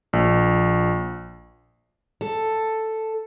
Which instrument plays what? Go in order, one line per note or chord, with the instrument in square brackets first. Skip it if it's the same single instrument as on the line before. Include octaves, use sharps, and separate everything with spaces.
[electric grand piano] A#1
[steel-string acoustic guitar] A4